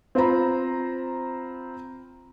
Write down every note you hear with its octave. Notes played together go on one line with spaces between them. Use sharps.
C4 F4 C5 A#5 B5